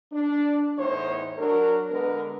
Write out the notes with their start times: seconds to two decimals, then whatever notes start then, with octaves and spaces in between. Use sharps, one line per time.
0.13 D4
0.78 E2 A2 D#4 C5 C#5
1.38 F#3 D4 A#4
1.90 D3 G#3 B3 A#4 B4